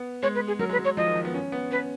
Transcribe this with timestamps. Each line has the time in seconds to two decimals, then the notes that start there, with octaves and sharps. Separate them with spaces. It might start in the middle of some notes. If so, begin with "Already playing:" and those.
Already playing: B3
0.23 G#3 C#5
0.35 B4
0.47 G#4
0.59 F#3 A#4
0.69 G#3 B4
0.79 F#3
0.85 C#5
0.97 F3 D#5
1.06 D#3
1.16 F3
1.25 B3
1.34 C#4
1.52 B3
1.71 C#4 B4